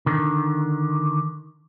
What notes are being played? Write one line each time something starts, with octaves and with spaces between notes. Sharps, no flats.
D3 D#3